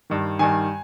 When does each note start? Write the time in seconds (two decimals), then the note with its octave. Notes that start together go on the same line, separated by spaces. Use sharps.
0.10 G2 D#3
0.39 G2 D#3 G#5